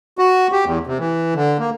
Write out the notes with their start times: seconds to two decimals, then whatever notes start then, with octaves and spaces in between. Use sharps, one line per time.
0.18 F#4
0.52 G4
0.65 E2
0.87 C3
0.99 E3
1.35 D3
1.59 A#3